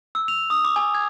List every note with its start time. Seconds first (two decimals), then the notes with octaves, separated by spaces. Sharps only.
0.15 E6
0.28 F7
0.50 D#6
0.65 D6
0.76 G#5
0.95 G#6